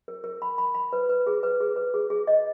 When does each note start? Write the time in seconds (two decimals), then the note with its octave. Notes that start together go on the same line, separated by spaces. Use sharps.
0.08 A#4
0.24 A#4
0.42 B5
0.58 B5
0.75 B5
0.93 B4
1.09 B4
1.27 G#4
1.43 B4
1.60 G#4
1.76 B4
1.94 G#4
2.10 G#4
2.27 D#5